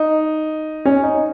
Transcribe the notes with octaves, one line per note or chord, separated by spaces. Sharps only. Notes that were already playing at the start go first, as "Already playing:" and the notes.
Already playing: D#4
C#4
D#4